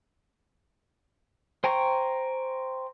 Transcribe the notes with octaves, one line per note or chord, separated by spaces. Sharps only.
C5 G5 G#5 A#5 C#6